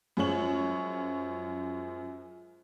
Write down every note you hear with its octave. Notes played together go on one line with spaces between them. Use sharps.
F#2 F3 G#3 C#5 F#7